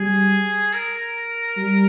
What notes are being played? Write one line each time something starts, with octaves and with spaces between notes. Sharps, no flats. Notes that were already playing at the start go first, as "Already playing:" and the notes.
Already playing: G3 G#4
A#4
G3